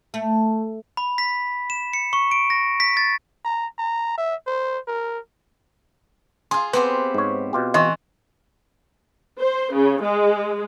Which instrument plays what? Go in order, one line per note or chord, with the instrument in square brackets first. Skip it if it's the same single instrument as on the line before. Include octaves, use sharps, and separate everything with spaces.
[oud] A3
[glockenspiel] B5
B6
E7
C#7
C#6
D7
A#6
B6
A6
[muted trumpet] A#5
A#5
E5
C5
A#4
[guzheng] F4 G#4 [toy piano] C6
[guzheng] B3 C4 G4 [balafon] B4 [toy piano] C6
[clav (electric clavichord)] G#2 C#5
B2 F4 G4
[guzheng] E3 [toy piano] D#5 C6 C#6
[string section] C5
C#3
G#3